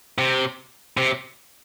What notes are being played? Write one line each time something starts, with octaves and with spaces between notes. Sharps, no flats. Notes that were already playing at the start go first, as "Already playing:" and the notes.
C3
C3